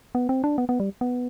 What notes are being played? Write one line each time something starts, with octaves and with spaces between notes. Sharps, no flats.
B3
C4
D4
B3
B3
G3
B3